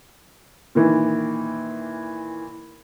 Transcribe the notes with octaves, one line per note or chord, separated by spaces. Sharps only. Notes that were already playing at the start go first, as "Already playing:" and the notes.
A#2 D#3 E3